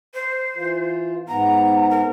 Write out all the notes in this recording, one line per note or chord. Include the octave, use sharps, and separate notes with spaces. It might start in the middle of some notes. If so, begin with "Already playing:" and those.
C5
E3 F4
G#2 B3 A#5
A#4